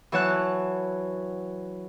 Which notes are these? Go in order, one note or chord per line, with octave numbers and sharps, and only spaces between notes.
E3 F#3 C#5 A5 F#6